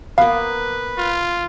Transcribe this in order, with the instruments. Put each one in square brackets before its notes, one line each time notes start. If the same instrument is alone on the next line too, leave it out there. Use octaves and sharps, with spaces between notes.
[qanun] A#3 B3 [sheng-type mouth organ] B4 [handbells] F5
[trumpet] F4